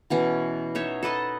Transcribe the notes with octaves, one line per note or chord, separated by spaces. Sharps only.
B2 E3 C#4
D#4 C#5 E5
A4 B4 D#5 A5